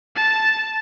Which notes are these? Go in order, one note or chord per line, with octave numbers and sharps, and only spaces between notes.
A5